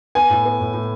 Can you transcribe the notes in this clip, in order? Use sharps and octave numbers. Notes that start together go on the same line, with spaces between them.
B3 G#5
A2
B3
A2
A2